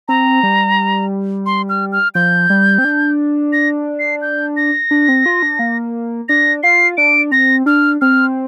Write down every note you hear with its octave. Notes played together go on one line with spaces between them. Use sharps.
C4 A#5
G3
C6
F6
F6
F3 G6
G3
C4
D4
A#6
C7
G6
A#6
D4
C4
F4
D4
A#3
D4 A#6
F4 C7
D4 D7
C4 A#6
D4 F6
C4 F6